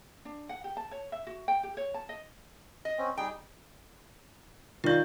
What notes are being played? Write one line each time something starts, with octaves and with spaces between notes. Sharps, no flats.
D4
F#5
G4
A5
C#5
E5
F#4
G5
G4
C#5
A5
D#5
D#5
C4 C#4
G3 D#4 G#4 G5
D#3 F4 D5 F5 G6